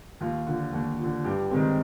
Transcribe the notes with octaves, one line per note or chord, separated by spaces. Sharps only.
D#2 F4
D3 F3
D#2
D3 F3
G2 G4
D#3 G#3 C4